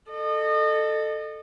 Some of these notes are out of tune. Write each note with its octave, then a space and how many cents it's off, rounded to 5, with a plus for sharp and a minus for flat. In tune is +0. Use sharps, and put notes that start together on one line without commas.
A4 +0 D#5 -30